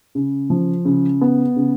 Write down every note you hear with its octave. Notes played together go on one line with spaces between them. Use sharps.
C#3
F3
C#3
B3
C#3